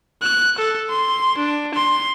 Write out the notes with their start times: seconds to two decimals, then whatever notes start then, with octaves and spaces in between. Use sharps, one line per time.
0.22 F#6
0.59 A4
0.90 C6
1.38 D4
1.74 C6